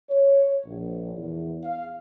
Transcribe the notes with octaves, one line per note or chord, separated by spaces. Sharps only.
C#5
A#1
E2
F5